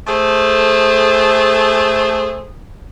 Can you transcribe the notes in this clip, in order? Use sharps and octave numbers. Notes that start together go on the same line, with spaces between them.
A3 G#4 A4 C5